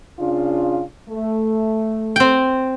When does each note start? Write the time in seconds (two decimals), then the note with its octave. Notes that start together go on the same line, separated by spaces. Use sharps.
0.19 C#3 D4 F4
1.09 A3
2.16 C4 G5